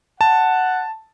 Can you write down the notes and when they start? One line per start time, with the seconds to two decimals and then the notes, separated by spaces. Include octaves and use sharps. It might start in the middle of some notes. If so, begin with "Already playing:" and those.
0.21 F#5 A5